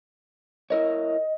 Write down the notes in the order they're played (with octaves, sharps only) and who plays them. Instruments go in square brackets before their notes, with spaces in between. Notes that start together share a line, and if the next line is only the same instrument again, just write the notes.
[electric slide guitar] E4 A#4 C#5 [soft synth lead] D#5